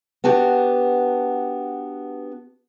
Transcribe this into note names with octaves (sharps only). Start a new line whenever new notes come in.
B3 D4 F#4 G4